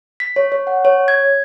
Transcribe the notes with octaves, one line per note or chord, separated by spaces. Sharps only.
B6
C#5
C#5
F#5
C#5
G#6